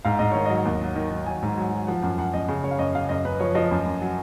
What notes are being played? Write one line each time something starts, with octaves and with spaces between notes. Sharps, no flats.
G#2 F5
G#2 D#5
D#3 C#5
F#3 D#5
D#2
F#3
D#3
D#3
F#3 G#5
G#2
F#3
F#3
F3 F#5
F#2 F#5
F#2 F#5
F#2 D#5
C#3
C#3 C#5
F5
F#2 D#5
C#3 F5
F#2 D#5
F#2 B4
F3 C#5
F3 D#5
F#2
F#2
F#3